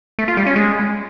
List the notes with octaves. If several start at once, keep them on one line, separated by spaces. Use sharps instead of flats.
A3
F4
G3
C#4
G#3